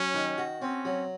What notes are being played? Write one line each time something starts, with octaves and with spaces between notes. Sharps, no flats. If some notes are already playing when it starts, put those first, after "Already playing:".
Already playing: F#3 C#4
D#3
F#4
C4 C#4
F#3